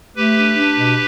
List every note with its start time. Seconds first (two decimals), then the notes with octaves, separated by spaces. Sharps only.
0.16 A3 G4 B4
0.36 D4
0.57 D4
0.77 B2